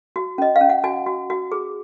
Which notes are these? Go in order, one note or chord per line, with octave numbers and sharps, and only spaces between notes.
F#4
C#4 D#5
F5
C#4
F#5
F#4 G#5
F#4
F#4
G#4